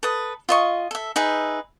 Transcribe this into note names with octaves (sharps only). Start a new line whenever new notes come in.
A4 B4 D#6
F4 D#5 C#6
A4 E5
D#4 G#4 B4 E5